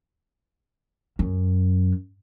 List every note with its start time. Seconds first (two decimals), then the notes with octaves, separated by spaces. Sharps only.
1.19 F#2